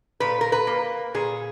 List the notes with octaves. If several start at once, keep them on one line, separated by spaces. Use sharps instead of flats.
A#2 B4
A#4
B4
A#3
A#2 G#4